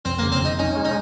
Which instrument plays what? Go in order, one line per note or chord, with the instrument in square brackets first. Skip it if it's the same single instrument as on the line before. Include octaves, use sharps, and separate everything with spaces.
[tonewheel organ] F2 [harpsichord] C4
[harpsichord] A#3
[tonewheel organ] C#3
[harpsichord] C4
[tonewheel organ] F2 [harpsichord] D#4
[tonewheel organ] C#4 [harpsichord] D#4
[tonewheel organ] G#3
[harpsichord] D#4